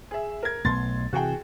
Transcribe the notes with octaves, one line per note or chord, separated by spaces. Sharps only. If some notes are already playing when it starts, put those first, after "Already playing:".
G#4 E5
A#4 G#6
B1 B2 A3 C6 A6
C3 E3 F#4 G#4 G5